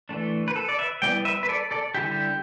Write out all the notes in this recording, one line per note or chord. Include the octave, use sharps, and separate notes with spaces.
E3 A3 D4
B4
A4
D5
B4 E5
G3 B3 E4 D5 G5
B4 E5
B4
A4 D5
A4 D5
D3 G3 E4 G4